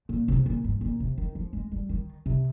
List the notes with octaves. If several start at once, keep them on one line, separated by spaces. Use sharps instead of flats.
A#2
C3
A#2
G2
A#2
C3
D#3
F3
G#3
G3
D#3
C3